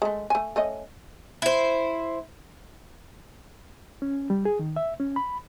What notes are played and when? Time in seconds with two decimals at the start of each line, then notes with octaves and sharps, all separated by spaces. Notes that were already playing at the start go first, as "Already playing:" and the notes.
0.02 G#3 A3
0.30 A3 G#5
0.56 A3 C#4 D#5
1.42 E4 C5
4.02 C#4
4.30 G3
4.45 G#4
4.59 D#3
4.76 E5
5.00 C#4
5.16 B5